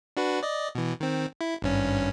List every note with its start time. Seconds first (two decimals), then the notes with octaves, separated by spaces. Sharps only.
0.17 D4 F#4 B4
0.43 D5 D#5
0.75 B2 E3
1.00 D#3 C4
1.41 E4
1.62 G#1 G2 C#4